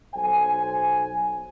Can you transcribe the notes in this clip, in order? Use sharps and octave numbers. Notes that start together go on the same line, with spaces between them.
B1 C5 G#5